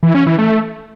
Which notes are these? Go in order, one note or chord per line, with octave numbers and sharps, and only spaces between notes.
E3
C#4
E3
A3